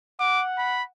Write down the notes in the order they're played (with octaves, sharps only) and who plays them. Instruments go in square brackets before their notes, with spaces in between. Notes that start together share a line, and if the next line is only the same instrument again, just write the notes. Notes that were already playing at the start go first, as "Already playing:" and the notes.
[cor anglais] F#5 [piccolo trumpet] D6
[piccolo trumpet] B5